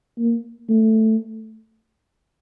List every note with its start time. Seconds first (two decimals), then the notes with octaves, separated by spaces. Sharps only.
0.19 A#3
0.70 A3